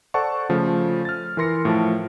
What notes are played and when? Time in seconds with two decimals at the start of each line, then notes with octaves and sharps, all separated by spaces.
0.14 A4 C5 D5 F#5 A5 C#6
0.49 C#3 F3 A3
1.05 F6 A6
1.37 E3 A#4 C6 A#6 C#7
1.65 A2 F3 A5